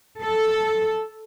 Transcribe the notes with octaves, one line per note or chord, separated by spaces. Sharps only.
A4